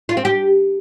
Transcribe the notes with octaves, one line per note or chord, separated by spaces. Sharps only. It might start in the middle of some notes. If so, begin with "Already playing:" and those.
F4
C4
G4